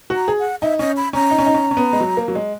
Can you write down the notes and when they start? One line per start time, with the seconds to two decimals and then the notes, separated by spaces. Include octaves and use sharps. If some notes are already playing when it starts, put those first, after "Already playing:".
0.10 F#4
0.16 A#5
0.28 G#4
0.39 F#5
0.62 D#4 E5
0.79 C#4 D#5
0.97 B5
1.13 C#4 A#5
1.31 D#4
1.38 C#4
1.46 D#4
1.54 C#4
1.71 C#4
1.77 B3
1.93 G#3
2.00 F#3
2.17 A#3
2.28 F#3
2.35 G#3